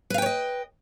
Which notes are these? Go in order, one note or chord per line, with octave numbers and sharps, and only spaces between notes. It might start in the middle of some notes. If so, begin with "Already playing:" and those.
B4 C#5 D#5 F5 G5